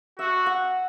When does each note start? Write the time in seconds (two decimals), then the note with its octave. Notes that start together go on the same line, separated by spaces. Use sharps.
0.19 F#4 E5
0.46 F#5